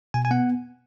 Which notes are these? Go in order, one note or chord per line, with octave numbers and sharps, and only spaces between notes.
B2 G#5
G#5
B3 F#5